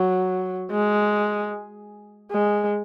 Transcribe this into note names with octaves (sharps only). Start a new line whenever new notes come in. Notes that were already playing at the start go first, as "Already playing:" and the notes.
Already playing: F#3
G#3
G#3